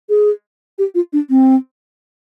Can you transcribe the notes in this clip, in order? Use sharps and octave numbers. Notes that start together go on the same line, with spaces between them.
G#4
G4
F4
D4
C4